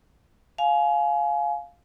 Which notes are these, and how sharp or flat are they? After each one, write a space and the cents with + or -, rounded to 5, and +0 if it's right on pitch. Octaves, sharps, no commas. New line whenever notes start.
F5 +5 G#5 +25